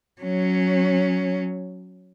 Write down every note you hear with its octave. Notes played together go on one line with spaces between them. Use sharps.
F#3 C#4